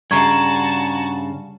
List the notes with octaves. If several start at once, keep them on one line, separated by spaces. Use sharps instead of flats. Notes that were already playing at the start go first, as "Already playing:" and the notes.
G2 C#3 F#4 A5 A#5 C#6 G#6